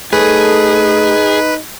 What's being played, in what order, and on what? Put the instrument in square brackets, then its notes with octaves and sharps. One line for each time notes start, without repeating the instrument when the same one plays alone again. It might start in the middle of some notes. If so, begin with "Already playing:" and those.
[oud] A3 C#5 [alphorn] D#4 [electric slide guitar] G#4 [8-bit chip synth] B4